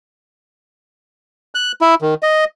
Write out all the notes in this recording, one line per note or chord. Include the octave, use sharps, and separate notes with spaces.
F#6
E4
D#3
D#5